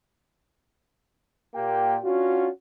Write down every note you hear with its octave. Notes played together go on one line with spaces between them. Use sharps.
A#2 A#3 G4 G5
C#4 D4 F4 F#4